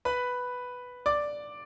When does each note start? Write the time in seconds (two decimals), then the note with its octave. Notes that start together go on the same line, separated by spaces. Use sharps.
0.05 B4 B5
1.06 D5 D6